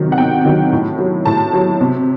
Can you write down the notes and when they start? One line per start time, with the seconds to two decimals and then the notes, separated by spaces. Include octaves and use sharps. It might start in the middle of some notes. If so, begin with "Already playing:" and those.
Already playing: C3 D#3 F#3
0.12 F#5
0.18 C3 G5
0.45 D#3 F#3
0.72 A2
0.99 F#3
1.26 A2 A5
1.53 F#3
1.81 C3